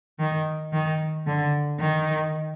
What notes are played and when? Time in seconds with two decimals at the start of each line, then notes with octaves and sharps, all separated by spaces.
0.19 D#3
0.73 D#3
1.26 D3
1.80 D#3